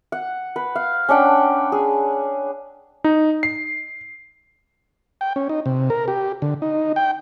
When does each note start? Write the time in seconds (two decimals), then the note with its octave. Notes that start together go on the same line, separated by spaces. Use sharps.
0.12 F#5
0.56 B4
0.75 F5
1.09 C#4 D4 F#5 G5
1.72 G#4
3.04 D#4
3.43 C7
5.21 G5
5.36 C#4
5.49 D#4
5.66 C3
5.90 A#4
6.08 G4
6.42 D3
6.62 D#4
6.96 G5